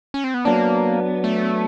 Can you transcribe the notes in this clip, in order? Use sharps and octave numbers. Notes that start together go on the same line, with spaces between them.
C#4
C4
B3
F#3 A#3 B3 D4
A3